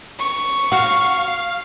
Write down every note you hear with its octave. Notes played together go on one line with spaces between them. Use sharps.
C#6
F#4 F5